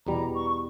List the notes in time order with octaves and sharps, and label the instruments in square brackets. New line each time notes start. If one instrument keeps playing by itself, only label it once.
[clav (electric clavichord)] E2 B2 G3 [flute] A#5
[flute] C#6
C#6